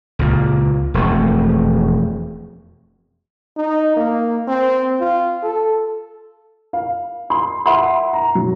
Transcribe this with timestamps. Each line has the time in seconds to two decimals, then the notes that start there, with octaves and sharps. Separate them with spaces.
0.19 C#2 A#2
0.94 E1 F2 A3
3.57 D#4
3.97 A#3
4.48 C4
5.00 F4
5.43 A4
6.73 F5
7.30 C6
7.66 E5 F#5 C6
8.13 A#5
8.35 F#3